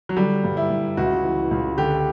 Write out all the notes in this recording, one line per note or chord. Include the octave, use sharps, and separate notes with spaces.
F#3
D3 G3
G2
E4
G2
C#2 F#4
E3
C#2
D3 G4